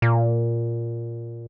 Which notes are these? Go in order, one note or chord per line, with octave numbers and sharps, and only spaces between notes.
A#2